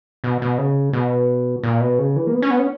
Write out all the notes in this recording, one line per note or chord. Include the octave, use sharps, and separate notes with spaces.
B2
B2
C#3
B2
A#2
B2
C#3
E3
A#3
B3
C#4
B3
C#4